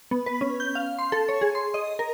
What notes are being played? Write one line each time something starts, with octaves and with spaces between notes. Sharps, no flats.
B3
B4
C#4
G6
F5
C6
A4
C#5
G#4
C6
D#5
A#4